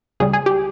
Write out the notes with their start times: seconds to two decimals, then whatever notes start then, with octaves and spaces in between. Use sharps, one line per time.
0.20 C#2 C#3 G3 G#4
0.33 G#4
0.46 G4